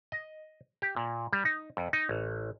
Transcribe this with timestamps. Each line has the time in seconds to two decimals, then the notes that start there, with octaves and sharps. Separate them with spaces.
0.12 D#5
0.82 G4
0.96 A#2
1.33 G3
1.45 D#4
1.77 F2
1.93 D#4
2.09 A1